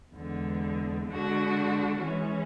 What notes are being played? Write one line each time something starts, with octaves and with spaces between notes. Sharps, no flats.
E2 D3 G#3
D3 G#3 D4 F#4
E3 G#3 C#4